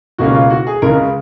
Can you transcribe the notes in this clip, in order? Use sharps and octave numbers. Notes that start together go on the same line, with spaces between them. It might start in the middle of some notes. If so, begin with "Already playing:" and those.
C#2 B2 A#3 C#4 F#4
F4
F#4
G#4
C#2 C#3 G#3 A#4